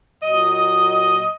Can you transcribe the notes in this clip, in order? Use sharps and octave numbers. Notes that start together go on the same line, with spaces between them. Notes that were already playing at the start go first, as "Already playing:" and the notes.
A#2 F#3 D#5